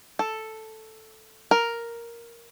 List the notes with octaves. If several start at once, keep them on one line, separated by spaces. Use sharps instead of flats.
A4
A#4